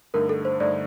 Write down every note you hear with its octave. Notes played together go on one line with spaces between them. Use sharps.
G2 D3 A3 D#4 A#4
A4
C5
G2 D3 A3 D#4 D5